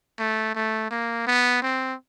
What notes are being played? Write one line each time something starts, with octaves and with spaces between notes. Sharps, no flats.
A3
A3
A#3
B3
C4